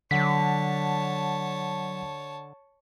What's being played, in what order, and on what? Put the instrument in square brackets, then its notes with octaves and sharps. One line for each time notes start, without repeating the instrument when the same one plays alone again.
[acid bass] D3 [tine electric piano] F#3 F#5 B6 [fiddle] C#5 A5